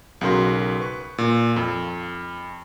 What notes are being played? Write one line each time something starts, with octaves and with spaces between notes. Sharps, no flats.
B1 C#3 F#4 A#4 C6
B4 C#6
A#2
F2